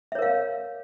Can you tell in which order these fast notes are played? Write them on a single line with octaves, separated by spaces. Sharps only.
E5 C#5 A#4 F5